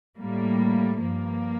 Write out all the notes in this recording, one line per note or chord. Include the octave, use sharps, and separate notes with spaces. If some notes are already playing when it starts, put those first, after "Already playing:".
A2 G3 A#3
G2 F3 A#3